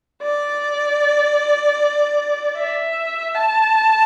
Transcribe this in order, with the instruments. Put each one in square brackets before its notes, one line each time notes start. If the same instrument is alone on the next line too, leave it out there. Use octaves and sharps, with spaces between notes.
[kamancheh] D5
E5
A5